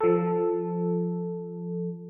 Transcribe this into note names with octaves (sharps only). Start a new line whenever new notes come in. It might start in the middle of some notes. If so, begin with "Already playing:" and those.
F3 A4